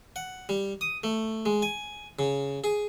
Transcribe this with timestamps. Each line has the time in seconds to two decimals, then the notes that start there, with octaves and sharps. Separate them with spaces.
0.16 F#5
0.49 G3
0.81 D#6
1.04 A3
1.46 G#3
1.62 G#5
2.19 C#3
2.64 G#4